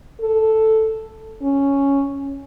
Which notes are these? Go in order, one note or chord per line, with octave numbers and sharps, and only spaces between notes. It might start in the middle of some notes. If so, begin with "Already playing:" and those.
A4
C#4